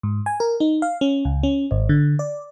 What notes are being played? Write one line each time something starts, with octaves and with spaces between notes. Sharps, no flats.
G#2
G#5
A#4
D#4
F5
C#4
C#2
C#4
G#1
D3
D5